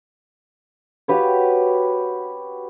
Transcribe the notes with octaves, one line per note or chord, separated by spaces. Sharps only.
F#4 G4 B4 C#5